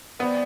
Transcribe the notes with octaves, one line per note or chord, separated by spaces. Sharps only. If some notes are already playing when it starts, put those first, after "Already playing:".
E3 G3 B3 C4